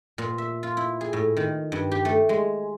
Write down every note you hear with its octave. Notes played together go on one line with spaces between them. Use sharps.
A#2
E5
F4
E4
G#4
A2
D#3
G2
G4
A3
G#3